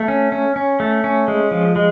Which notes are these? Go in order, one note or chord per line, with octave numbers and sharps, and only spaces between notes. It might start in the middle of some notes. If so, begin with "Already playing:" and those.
Already playing: A3
C#4
C#4
C#4
A3
C#4
G#3
F3
G#3